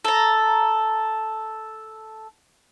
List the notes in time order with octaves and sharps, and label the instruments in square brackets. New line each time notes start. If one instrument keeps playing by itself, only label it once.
[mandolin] A4 A#5